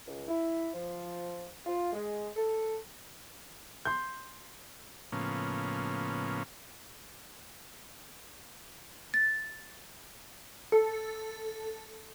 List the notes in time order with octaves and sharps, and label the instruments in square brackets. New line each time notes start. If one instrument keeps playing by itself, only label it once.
[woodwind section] C#2
E4
F3
F4
G#3
A4
[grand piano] C6 G6
[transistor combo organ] A2 C#3 F3 A#3 B3 C#4
[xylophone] A6
[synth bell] A4